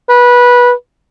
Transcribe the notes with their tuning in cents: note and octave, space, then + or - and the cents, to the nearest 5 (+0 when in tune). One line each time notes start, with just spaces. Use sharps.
B4 -20